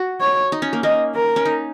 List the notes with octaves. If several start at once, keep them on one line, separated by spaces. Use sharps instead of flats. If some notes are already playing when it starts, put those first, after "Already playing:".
Already playing: F#4
C#5
D#4
C#4
A#3
A#3 D#5
A#4
C#4
D#4